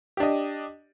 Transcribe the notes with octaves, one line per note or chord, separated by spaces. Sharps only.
D4 G4 D#5